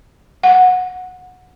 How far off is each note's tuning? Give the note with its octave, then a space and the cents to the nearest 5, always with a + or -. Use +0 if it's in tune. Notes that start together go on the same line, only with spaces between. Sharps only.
F#5 -15